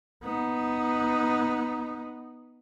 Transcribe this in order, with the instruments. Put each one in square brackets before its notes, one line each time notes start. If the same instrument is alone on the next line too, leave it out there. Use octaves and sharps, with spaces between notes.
[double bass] B3 D#4